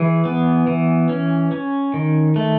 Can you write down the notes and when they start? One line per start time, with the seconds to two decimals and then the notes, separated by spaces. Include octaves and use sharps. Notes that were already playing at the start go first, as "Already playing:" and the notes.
Already playing: E3 G#4
0.25 B3
0.67 E3
1.09 C#4
1.52 C#4
1.94 D#3
2.36 A3